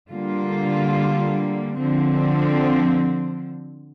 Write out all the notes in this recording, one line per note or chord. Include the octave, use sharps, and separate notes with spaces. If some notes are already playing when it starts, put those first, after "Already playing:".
D3 G3 A#3 F4
D3 F3 C4